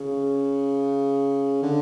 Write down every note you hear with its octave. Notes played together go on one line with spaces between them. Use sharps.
C#3
D3